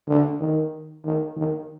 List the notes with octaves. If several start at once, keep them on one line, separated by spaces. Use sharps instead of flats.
D3
D#3
D#3
D#3